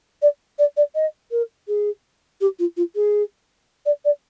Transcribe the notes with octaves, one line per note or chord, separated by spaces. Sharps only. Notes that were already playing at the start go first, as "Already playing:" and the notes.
D5
D5
D5
D#5
A#4
G#4
G4
F4
F4
G#4
D5
D5